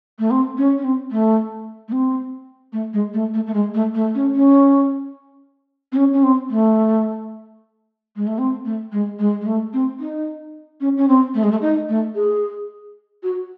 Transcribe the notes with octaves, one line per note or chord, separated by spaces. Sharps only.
A3
C4
C#4
C#4
C4
A3
A3
C4
A3
G#3
A3
A3
A3
G#3
A3
A3
C#4
C#4
C4
C#4
C#4
C4
A3
G#3
A3
C4
A3
G#3
G#3
G#3
A3
C4
D#4
C#4
C#4
C4
A3
G#3
A3
D#4
A3
G#4
F#4